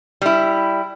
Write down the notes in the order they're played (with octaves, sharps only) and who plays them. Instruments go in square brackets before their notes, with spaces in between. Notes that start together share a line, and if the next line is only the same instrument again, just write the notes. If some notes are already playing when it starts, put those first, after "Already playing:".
[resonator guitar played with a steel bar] G3 E4